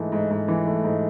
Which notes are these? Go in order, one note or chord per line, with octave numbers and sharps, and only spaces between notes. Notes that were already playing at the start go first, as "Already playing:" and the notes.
Already playing: G#2 E3 A3
G#2
G#2
E3
A3
G#2